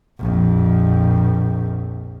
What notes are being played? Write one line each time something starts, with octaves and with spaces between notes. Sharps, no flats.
A#1 F2